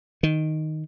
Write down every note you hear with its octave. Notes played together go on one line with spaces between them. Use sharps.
D#3